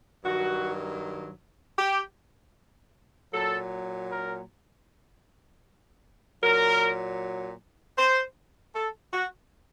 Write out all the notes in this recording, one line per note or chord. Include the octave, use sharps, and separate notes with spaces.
G2 D#3 F#3 F#4
G4
A#2 F#3 A4
A#4
A#2 F#3 A#4
C5
A4
F#4